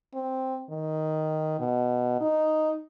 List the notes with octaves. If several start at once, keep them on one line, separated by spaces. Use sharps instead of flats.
C4
D#3
B2
D#4